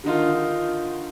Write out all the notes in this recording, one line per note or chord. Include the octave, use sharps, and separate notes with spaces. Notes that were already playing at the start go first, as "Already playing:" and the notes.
D3 D#3 D#4 F4